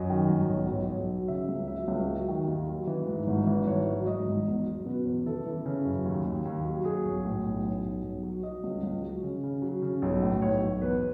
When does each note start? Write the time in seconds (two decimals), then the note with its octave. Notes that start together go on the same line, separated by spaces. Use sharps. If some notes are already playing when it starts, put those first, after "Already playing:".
Already playing: F#2 D#5
0.10 D#3
0.30 G#1
0.49 B1
0.69 B1
0.89 B1
1.09 F#3
1.28 C#3 E5
1.49 C#2
1.68 F#3 E5
1.88 C#2
2.07 F#3
2.28 D#3
2.47 D#2
2.67 F#3
2.87 E3
3.07 G#2
3.27 G#1
3.47 E3
3.67 G#1 C#5
3.87 F#3
4.07 G#2 D#5
4.26 G#1
4.47 E2
4.66 F#3
4.86 B2 B4
5.05 E2
5.26 E3 A4
5.46 E3
5.66 C#3
5.85 F#2
6.05 D#2
6.25 D#2
6.45 D#2
6.65 F#3
6.84 F#3 G#4
7.05 B1
7.25 A2
7.44 B1
7.63 B1
7.84 B1
8.04 B1
8.23 F#3
8.43 F#3 D#5
8.64 C#2
8.83 C#2
9.02 F#3
9.23 C#3
9.43 C#3
9.62 F#3
9.82 C#3
10.02 B1
10.22 A2
10.42 B1 C#5
10.62 B1
10.82 E2 B4